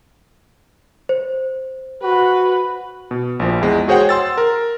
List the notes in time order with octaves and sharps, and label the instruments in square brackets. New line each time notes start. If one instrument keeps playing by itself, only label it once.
[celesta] C5
[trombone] F#4 [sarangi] B4
[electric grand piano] B2
A#1 F3
E2 G#3
F#4 G#4 C5 C#5 F#5 G5
C6 E6 A6
A#4